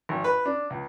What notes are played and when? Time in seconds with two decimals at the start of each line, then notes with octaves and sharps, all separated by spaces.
0.09 G#1
0.24 B4
0.46 D4
0.70 C#2